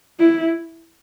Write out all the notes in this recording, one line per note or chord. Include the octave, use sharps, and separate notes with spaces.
E4